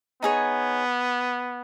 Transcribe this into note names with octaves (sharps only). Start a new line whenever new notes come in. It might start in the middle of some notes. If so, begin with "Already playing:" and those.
B3 D#4 G#4 C#5